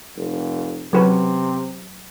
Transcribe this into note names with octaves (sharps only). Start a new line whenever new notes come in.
F1
C3 F#3 F#4 B4